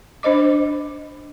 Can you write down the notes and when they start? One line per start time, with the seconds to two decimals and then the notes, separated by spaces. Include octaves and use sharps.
0.23 D4 C5 D#5 D6